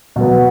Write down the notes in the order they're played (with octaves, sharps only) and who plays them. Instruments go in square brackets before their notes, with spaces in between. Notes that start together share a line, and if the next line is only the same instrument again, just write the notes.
[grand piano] B2 F#3 B3